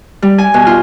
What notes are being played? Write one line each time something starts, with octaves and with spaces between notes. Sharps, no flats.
G3
G#5
B2
F4